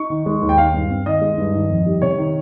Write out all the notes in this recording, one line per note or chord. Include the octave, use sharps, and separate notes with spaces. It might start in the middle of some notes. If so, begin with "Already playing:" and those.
Already playing: D#4 C#6
D#3
G#3
D#2
G5
G#3 F5
G2
C4
D#3 D#5
G#3
G2
D#3
F2
G3
C3 C#5
D#3